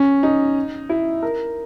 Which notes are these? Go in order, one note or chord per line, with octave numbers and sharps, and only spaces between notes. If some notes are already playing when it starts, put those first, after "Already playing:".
Already playing: C#4
D#4
E4
A#4